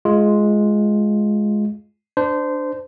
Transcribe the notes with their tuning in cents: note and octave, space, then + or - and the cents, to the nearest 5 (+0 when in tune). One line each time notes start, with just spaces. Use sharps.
G#3 +10 F4 +0
D4 +5 C5 -25